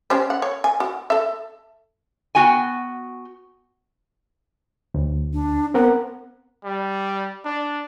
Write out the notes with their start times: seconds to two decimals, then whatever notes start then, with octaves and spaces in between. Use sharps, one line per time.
0.10 C#4 G4 C5
0.30 F#5
0.42 C#5
0.64 G#5
0.80 F#4
1.10 A4 E5
2.35 B3 F#4 G5 G#5
4.94 D2
5.33 D4
5.74 B3 C4 A#4 F#5
6.64 G3
7.45 D4